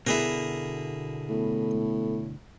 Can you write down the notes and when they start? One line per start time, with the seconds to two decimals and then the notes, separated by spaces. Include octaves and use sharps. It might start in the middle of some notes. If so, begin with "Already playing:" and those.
0.07 B2 D3 E4 G#4 A#4
1.29 A2 B3 A4